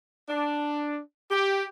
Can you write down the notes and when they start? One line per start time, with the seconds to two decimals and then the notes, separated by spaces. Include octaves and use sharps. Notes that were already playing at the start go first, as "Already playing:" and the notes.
0.29 D4
1.31 G4